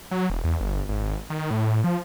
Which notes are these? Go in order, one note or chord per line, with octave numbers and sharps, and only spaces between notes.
F#3
E1
E2
G1
G#1
D#3
A2
F3